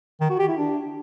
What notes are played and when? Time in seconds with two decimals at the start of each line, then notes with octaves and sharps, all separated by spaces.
0.21 D#3
0.30 F#4
0.39 G4
0.48 E4
0.58 D4